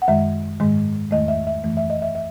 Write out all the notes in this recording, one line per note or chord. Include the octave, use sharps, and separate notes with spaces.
F#5
F#2 D#3 G#3 E5
G#2 D#3 G#3
E2 D#3 A3 D#5
E5
E5
F#2 E3 A3
E5
D#5
E5
E5